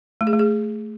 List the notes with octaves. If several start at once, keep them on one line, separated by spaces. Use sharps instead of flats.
A3
G#4
A3
G#4